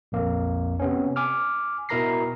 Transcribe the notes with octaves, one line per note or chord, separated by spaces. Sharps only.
A#1 F2 A#3
C3 B3 C#4
G#5 D6 F6
B2 E4 A#4 A#5 A#6 C7